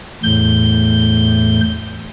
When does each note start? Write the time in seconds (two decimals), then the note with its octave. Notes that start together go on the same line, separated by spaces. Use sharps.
0.24 E2 A2 G6